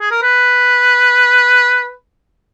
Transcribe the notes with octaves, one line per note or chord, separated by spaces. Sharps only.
G#4
A#4
B4